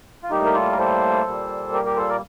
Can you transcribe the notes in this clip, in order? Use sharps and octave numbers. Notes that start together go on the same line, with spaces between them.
F4
A2 G3 A#3 D#4 G4
A#4
F4 A4
A#4
A4 C5
A#2 G3 A#3
G4 A#4
G4 A#4
A4 C5
A#4 D5